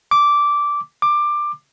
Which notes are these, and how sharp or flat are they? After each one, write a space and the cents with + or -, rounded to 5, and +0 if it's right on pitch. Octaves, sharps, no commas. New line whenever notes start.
D6 -10
D6 +15